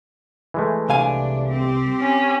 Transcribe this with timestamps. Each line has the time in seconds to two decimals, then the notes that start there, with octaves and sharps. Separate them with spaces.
0.54 E3 G#3 A3
0.89 C2 D4 F5 G#5
1.49 C4 G4
2.02 C#4